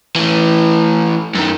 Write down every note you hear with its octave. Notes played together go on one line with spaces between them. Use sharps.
E3 A3
F#2 D#3